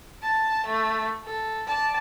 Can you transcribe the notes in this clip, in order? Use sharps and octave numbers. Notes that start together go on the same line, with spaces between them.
A5
A3
A4
D5 A5